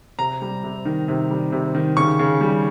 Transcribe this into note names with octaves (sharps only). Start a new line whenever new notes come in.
C3 A#5
G3
C3
D#3
C3
G3
C3
D#3
C#3 C#6
C#3
G3